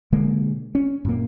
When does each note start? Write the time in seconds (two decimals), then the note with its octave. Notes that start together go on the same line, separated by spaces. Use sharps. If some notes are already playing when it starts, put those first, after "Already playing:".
0.12 B2 D3 G#3 A#3
0.75 C#4
1.05 F#2 A#2 A#3